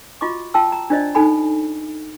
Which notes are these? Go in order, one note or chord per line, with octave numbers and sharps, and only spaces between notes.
F4 F#4 D#5 C#6 D6
F4 E5 G5 A5 E6
A#5
D4 F4 C5 D5 D#5
D#4 A4 G#5 B5